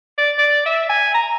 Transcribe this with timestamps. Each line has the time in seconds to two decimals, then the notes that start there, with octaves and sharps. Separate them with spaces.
0.18 D5
0.38 D5
0.66 E5
0.90 G#5
1.14 A#5